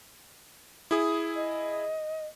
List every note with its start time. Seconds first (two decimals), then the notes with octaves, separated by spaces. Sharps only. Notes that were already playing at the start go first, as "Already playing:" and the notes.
0.91 E4 G#4 D#6
1.35 D#5